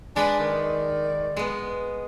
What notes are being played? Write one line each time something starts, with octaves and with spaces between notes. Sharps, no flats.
G#3 D4 B4 G#5 B5
D#3 D5
G#3 B3